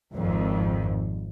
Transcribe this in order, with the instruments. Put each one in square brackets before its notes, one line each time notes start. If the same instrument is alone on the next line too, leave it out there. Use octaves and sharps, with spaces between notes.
[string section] G#1 F2